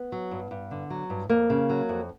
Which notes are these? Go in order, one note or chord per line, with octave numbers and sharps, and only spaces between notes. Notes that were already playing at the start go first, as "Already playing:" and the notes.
Already playing: B3
F#3
G2
G2
D3
F#3
G2
F2 A#3
C#3
F#3
F2